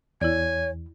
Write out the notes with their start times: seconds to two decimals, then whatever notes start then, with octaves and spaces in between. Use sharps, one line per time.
0.21 E2 E4 C#5 D5 G#5